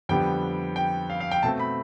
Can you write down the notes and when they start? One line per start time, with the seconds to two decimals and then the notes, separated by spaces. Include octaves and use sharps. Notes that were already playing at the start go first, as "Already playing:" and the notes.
0.09 F2 D3 G3 B3 G5
0.76 G5
1.10 F5
1.20 F5
1.31 G5
1.43 B2 A3 C4 A5
1.59 B5